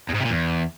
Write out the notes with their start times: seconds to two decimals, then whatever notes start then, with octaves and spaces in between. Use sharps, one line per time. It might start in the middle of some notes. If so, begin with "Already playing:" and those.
0.09 E2
0.14 G#2
0.20 C3
0.25 A#2
0.31 E2